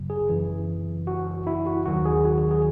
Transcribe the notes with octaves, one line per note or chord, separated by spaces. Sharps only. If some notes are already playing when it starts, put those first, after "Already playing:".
Already playing: G#1 F#2 C#3 F#3
G#4
F#2 C#3 E3
F#4
E4
F#4
D#2 D#3 F#3 F#4
G#4
F#4
G#4
G#4